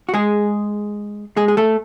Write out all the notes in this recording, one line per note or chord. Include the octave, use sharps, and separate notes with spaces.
F#4
G#3 G#4
G#3 G#4
G#4
A3 A4